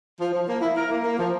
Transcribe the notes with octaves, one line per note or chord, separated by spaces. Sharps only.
F3
F3
A#3
E4
A#4
A#3
A#3
F3